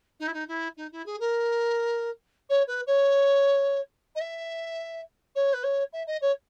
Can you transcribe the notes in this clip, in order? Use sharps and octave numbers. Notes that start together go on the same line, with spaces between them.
D#4
E4
D#4
E4
D#4
E4
G#4
A#4
C#5
B4
C#5
D#5
E5
C#5
B4
C#5
E5
D#5
C#5